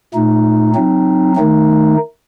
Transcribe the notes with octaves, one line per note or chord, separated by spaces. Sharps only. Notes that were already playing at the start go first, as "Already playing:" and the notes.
A#2 A3 D#4
F#3 C4 D#4
D#3 A3 D#4